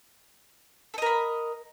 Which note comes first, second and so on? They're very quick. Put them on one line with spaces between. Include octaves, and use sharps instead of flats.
A4 D#5 A#4 B5